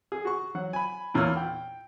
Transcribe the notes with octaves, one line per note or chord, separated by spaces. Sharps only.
G#4
F#4 C#6
F#3 F#5
G#5 B5
E2 A#2 E3 C#5 E6 F6
G5